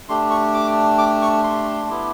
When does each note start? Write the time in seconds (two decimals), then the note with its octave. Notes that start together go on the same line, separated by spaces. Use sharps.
0.09 A3 D4 G4 C6
0.30 C#6
0.54 D6
0.98 D6
1.22 C#6
1.44 C6
1.89 B3 E4 G4